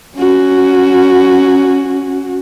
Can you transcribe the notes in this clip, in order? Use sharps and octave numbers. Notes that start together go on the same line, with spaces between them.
C#4 F#4